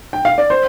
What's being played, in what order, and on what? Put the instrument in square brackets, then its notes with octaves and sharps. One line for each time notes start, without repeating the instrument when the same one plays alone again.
[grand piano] G5
F5
D5
C5